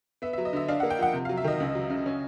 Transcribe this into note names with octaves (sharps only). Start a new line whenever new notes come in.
B3 E5
E5
F#3
D#5
D3 E5
D4 F5
F#5
A#3
G5
F3 F#5
C3
F5
F#3
E5
D#3 D#5
C#2
F#3
C#3
C#4